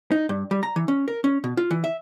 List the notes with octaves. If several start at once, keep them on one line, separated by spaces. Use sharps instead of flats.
D#4
G2
G3
A#5
E3
C#4
A#4
C#4
B2
F4
E3
E5